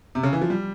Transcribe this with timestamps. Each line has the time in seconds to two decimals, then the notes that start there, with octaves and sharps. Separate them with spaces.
0.15 C3
0.23 C#3
0.33 E3
0.41 F3
0.50 G3